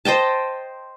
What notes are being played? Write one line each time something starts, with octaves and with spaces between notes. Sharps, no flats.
C5 D#5 G5 A5